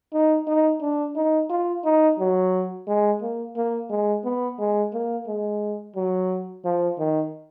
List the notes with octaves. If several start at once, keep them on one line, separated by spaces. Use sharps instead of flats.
D#4
D#4
D4
D#4
F4
D#4
F#3
G#3
A#3
A#3
G#3
B3
G#3
A#3
G#3
F#3
F3
D#3